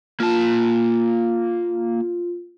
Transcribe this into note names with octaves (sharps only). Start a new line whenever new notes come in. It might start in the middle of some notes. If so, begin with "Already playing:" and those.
A#3 F4 A5